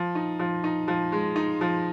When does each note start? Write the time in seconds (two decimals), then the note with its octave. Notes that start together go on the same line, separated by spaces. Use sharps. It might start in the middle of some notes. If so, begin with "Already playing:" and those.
Already playing: F3
0.15 D#4
0.39 F3
0.64 D#4
0.88 F3
1.12 G#3
1.36 D#4
1.61 F3